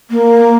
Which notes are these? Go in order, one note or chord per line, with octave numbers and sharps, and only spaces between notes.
A#3